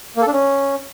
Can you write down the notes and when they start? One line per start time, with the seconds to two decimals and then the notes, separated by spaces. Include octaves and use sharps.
0.17 A#3
0.22 A4
0.27 D4
0.32 C#4